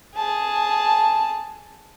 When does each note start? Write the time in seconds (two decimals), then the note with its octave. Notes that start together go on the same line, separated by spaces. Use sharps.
0.16 G#4 A5